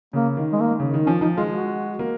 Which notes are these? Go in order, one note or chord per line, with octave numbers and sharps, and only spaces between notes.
C#3 A#3
D#3
G#3
A#3
C#3
D#3
F3 C#4
F3 D#4
G#3 F4
F#4
A#3